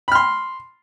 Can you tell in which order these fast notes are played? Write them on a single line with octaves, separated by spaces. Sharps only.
B5 F6 C6